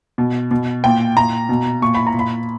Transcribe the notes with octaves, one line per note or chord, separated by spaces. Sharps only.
B2
B2
A#2 G5
A#2 A#5
B2
A#2 C#6
B5
A#5
A#2
B5